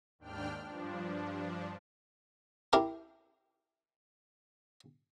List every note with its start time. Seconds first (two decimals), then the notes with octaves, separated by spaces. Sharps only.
0.19 D#2 G#2 D4 G5 F6
0.63 G2 F3 D4
2.73 E4 G4 A#4